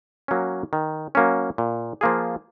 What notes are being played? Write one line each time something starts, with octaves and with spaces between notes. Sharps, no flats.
F#3 A#3 C#4
D#3
F#3 A#3 C#4
A#2
F3 A#3 F4 G#4